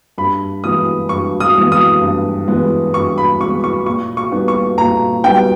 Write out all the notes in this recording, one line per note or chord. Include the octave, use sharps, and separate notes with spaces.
G2 B5
E3 G#3 B3 D#6
G2 C#6
D#6
E3 G#3 B3
D#6
G2
E3 G#3 B3
G2 C#6
B5
E3 G#3 B3 C#6
C#6
A#2 C#6
C#6
G3 B3 D#4
C#6
A#2 A#5
G3 B3 D#4 G5